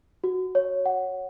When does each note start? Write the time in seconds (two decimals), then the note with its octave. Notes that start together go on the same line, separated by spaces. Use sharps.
0.24 F#4
0.55 C#5
0.86 F#5